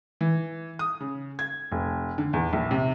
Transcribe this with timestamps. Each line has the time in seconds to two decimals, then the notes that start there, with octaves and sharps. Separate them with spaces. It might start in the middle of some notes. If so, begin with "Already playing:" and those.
0.21 E3
0.79 D#6
1.00 C#3
1.39 G#6
1.72 F1
2.18 D3
2.33 E2
2.53 A#1
2.71 C3